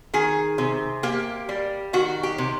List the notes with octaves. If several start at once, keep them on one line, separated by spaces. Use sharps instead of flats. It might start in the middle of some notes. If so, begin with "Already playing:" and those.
D#3 G#4
C3
A#3 G4
G3
D#3 F#4
G4
C3